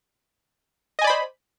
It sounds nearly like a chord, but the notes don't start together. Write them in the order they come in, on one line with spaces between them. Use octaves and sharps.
D#5 G#5 D5 B5 C5